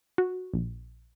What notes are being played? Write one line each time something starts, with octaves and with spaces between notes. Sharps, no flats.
F#4
A#1